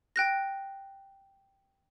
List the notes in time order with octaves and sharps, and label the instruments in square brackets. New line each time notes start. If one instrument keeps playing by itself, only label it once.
[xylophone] G5 F#6 A#6